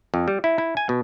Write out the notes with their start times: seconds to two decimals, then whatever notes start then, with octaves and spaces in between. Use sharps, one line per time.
0.14 F2
0.28 G3
0.44 E4
0.58 E4
0.77 G#5
0.89 B2